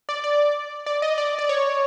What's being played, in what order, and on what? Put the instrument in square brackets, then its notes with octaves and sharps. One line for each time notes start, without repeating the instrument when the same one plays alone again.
[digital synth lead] D5
D5
D5
D#5
D5
D5
C#5